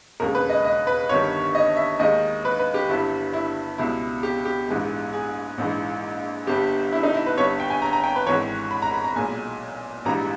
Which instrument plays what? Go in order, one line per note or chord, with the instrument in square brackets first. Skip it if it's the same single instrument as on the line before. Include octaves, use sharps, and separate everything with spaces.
[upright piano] E1 D#2 C#3 G#3 A#4
B4
D#5
D#5
B4
G1 G2 D#3 G3 C#5
D#5
E5
D#2 D#3 G#3 D#5
B4
B4
G4
G1 G2 G3 E4
E4
C#2 B2 G3 E4
G4
G4
A#1 G#2 E3 G#3
G#4
A#1 G#2 E3
G1 G2 G3 G4
E4
D#4
E4
B4
G1 G2 G3 C#5
G5
G#5
A#5
A#5
G5
B4
G#1 G#2 E3 C#5
B5
A#5
B5
A#5
B1 A#2 G#3 G#5
A#1 G#2 E3 G3 A#5